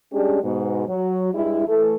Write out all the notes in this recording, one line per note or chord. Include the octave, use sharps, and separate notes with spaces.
G3 G#3 C#4 D4 G4 G#4
G#2 B2
F#3
G2 G3 G#3 E4
E3 A3 A4